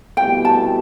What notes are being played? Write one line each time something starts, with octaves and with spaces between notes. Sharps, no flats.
C2 B2 A3 E4 G4 G5
A5